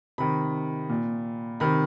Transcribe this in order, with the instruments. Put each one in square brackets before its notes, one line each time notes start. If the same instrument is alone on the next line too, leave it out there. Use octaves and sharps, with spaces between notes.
[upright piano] C3 D#3 B5
A#2
C3 D#3 B5